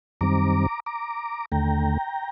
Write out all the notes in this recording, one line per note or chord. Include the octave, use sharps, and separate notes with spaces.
F#2 D#3 G3 C4 A#5 D6
A#5 D6
D#2 D3 A3 G5 A#5